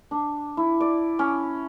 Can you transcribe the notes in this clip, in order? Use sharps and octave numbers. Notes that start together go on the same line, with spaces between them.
D4
E4
D5
C#4